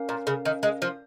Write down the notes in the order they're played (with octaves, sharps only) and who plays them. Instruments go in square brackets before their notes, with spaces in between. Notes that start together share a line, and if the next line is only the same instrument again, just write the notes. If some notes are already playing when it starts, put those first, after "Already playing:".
Already playing: [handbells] C#4 A#4 F5
[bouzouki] A#2
C#3
D#3
G#3
F3